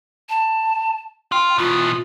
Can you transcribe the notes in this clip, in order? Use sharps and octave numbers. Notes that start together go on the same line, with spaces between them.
A5
F4 G5
B2 E3 F4